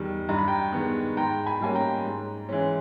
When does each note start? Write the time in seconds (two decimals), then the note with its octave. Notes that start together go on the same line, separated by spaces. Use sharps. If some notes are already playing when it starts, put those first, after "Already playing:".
Already playing: E2 D#3 G3
0.29 G2 A#5
0.38 B5
0.48 G5 A#5
0.72 D#3 G#3 B3
1.17 G#2 G5 A#5
1.46 G#5 B5
1.61 G3 A#3 C#4 G#5
1.75 G5 A#5
2.05 G#2
2.49 E3 G#3 C#4